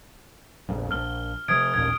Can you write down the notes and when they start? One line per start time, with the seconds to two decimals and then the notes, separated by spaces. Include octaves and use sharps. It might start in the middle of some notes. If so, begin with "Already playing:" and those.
0.69 E1 A#1 F2
0.91 A#1 F6 G7
1.48 C3 F3 D#6 G#6 D7
1.74 A1 D#2 A#2 G#6